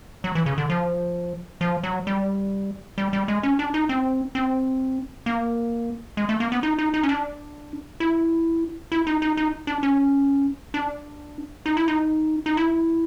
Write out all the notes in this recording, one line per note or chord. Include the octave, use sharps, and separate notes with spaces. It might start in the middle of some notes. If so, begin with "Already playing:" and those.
F#3
E3
C#3
D3
F3
F3
F#3
G3
G3
G3
G#3
C#4
D4
D#4
C4
C4
A#3
G#3
A3
A#3
B3
D#4
D#4
D#4
C#4
D4
E4
E4
D#4
D#4
D#4
D4
C#4
D4
D#4
E4
D#4
D#4
E4